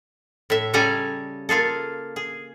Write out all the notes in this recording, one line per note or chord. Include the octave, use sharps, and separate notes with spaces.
A2 E5
C#3 G3 A4 G#5 A#5
A#3 F4 G#4 A4
G#4